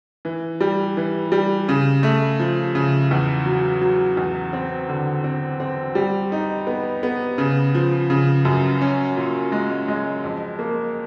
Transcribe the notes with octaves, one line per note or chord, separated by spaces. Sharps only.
E3
G3
E3
G3
C#3
A3
F3
C#3
E2
F#3
F#3
E2
C4
D3
C4
C4
G3
D#4
B3
B3
C#3
F3
C#3
F#2
C#4
A#2
G#3
G#3
F2
A#3